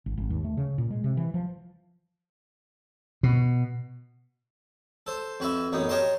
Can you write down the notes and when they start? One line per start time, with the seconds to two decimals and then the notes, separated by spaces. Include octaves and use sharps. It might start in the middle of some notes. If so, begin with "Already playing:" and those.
0.06 G#1
0.18 G#1
0.30 D#2
0.44 A3
0.57 C#3
0.78 A#2
0.91 G#3
1.04 C3
1.17 E3
1.34 F3
3.23 B2
5.06 A4 C5
5.40 F2 F#4 B4 E5
5.72 A1 F#2 B3 D#4
5.89 G4 A#4 C#5 D#5 A5 C6